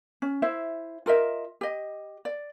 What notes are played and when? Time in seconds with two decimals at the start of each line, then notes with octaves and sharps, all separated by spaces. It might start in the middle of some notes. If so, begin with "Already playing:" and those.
0.22 C#4
0.42 E4 C5 E5
1.06 F4 A#4 D#5 E5
1.61 G4 D#5
2.25 D5